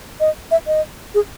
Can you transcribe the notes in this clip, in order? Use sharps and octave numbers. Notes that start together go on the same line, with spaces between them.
D#5
E5
D#5
G#4